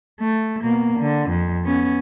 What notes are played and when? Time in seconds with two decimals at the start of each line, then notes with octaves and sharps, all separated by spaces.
0.20 A3
0.63 B2 A#3
0.99 D3
1.29 F2
1.63 B3 C#4